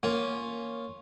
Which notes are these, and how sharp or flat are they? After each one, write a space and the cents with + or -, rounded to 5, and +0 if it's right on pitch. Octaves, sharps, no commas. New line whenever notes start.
A#3 +0 C#4 +0 F4 +0